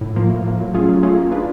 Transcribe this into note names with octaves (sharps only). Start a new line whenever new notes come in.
A2
F3 A#3
A2
F3 A#3
F#3
A3 C#4 F4 G#4
F#3
A3 C#4 F4 G#4
A#3
D4 F4 G#4 B4